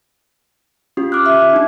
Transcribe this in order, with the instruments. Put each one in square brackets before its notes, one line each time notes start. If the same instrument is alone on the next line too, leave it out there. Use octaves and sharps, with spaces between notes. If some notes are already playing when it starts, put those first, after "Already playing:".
[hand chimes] C#4 F4 G4
D6 F6 F#6
[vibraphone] E5
[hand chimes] D4 D#4